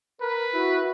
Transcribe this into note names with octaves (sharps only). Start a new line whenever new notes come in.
A#4 B4
E4 F#4